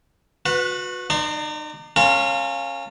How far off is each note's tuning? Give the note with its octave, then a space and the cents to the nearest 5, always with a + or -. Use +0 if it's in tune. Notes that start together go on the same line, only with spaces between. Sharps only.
F#4 -30 B4 +0
D#4 -35 D5 +5 C6 +0
C#4 -15 F4 +0 A#4 -45